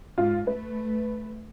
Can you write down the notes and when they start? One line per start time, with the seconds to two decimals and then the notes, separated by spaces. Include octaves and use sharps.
0.18 G#2 F4
0.47 A3 B4